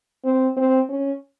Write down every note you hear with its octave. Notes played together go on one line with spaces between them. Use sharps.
C4
C4
C#4